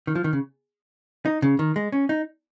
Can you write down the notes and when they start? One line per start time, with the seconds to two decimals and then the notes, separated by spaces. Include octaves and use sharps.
0.07 D#3
0.15 F3
0.24 D#3
0.33 C#3
1.25 D#4
1.42 C#3
1.59 D#3
1.76 G#3
1.92 C#4
2.09 D#4